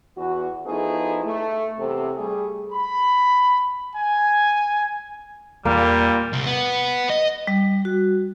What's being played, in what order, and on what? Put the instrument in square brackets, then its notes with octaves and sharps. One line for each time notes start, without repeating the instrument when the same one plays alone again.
[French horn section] E2 F#4
F3 A3 B3 D#4 E4 G#4
A3
E2 C3 A4
G3 A3 G#4
[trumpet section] B5
G#5
[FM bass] E2 [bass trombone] A#2 [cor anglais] G3 [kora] A#3
[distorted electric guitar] C2
B3
D#5
[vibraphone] G3
F#4